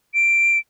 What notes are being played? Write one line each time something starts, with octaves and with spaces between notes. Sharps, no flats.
D7